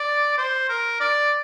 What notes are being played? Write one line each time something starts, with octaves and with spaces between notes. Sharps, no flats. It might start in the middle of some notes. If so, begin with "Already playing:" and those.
Already playing: D5
C5
A#4
D5